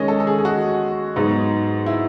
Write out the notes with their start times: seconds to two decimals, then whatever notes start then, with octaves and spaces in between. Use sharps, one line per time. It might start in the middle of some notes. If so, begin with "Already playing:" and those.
Already playing: D#3 G#3 C#4 C#5 D#5
0.08 A4
0.20 A4
0.27 G#4
0.38 G#4
0.45 F#4
1.16 G#2 F#3 B3 D#4
1.86 E4